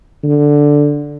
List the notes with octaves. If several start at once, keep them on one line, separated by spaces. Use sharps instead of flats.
D3